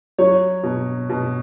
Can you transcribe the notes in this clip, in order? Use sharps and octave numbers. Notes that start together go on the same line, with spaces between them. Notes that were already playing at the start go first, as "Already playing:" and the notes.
F#3 C#5
B2
B2